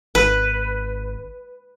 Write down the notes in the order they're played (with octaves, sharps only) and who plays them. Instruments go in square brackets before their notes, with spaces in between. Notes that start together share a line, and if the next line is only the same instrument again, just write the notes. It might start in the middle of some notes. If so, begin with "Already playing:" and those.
[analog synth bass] G#1 [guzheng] B4